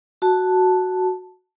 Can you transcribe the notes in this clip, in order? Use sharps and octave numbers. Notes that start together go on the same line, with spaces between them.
F#4 A5